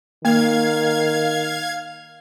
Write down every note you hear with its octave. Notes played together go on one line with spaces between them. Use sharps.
D#3 A#3 F5 G#6